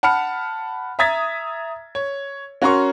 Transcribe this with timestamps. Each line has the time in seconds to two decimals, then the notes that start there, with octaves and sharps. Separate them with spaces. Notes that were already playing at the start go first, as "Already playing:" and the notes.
0.03 F#5 A5 B5 F6 C#7
0.99 E5 A#5 D#6 G#6 A6 B6
1.95 C#5
2.62 C#4 F#4 A#4 A#5 C6 C#6